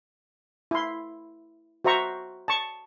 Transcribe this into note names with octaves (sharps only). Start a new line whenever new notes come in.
E4 C6
F#4 C5 E5 A#5 C#6
A5 C#6